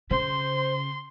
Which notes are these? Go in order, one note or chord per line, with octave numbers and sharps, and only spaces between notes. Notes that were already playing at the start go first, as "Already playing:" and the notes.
C#3 C5 C6